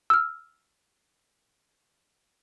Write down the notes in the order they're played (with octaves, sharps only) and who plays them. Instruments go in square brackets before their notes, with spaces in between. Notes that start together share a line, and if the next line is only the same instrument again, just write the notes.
[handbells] E6 F6